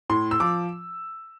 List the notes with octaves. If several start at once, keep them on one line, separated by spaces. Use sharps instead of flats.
A2 C6
E6
F3 D6